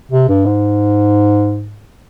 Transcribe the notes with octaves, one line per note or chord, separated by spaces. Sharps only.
C3
G2
G#2